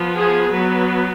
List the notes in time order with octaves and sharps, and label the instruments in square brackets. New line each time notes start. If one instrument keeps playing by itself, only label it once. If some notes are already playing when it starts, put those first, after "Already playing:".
Already playing: [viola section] F3 B3
G#4
F#3 B3 B4